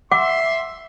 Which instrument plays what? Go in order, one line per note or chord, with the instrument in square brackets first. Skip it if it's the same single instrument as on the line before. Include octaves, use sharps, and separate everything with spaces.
[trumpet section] E5 C6 [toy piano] F#5 D6